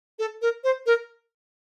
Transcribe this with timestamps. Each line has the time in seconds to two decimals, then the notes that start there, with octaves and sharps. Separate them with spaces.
0.19 A4
0.42 A#4
0.64 C5
0.86 A#4